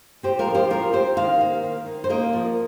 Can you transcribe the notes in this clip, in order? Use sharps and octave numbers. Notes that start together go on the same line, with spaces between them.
C4 G4 C5
F4 A#4
F3
G4 C5
C4 F4 A#4
C4 G4 C5
D#3 C5 F5
A#3
D#3
D#4
C5
A#3 A#4 D#5
F3